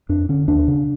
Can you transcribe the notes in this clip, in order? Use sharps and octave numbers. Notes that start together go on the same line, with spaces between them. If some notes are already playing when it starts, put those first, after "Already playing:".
F2 D4
D3 C#4
D#2 D4
C#3